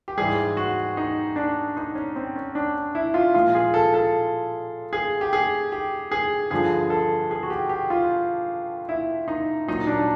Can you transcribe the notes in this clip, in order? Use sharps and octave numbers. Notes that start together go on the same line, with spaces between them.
G4
G#2 E3 G3 G#4
F#4
D#4
D4
D#4
C#4
C4
C#4
D4
E4
F4
A#2 F3 G#3 F4
G#4
A4
A4
G#4
G4
G#4
G4
G#4
G2 D3 F3 G#4
A4
G#4
F#4
G4
G4
F4
E4
D#4
A#2 F#3 D#4
D4
D4